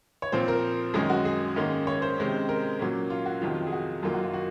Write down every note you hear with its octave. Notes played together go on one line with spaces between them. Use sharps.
C#5
A#2 F3 C4 C5
A#4
F#2 D#3 G#3 C#4 G#4
F#4
G#4
G#2 D#3 A#3 C#4
C#5
C5
C3 D#3 G#3 C#4
A#4
A#2 F#3 A#3 C#4
F4
F#4
F2 C3 D#3 F#3 F4
G#4
F#4
F#2 D#3 F#3 A#3 F4
F#4
F4
F#4